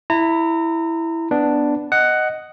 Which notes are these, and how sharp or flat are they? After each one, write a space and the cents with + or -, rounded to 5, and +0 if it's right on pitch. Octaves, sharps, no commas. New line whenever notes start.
E4 +0 A#5 -30
B3 +0 D4 +0
D#5 +0 F#5 +10